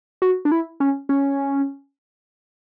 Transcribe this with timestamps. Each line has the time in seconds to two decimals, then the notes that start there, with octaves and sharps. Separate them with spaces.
0.22 F#4
0.45 D4
0.52 E4
0.80 C#4
1.09 C#4